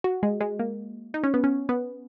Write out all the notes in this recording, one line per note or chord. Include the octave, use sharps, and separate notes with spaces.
F#4
G#3
G#3
A#3
D#4
C#4
B3
C#4
B3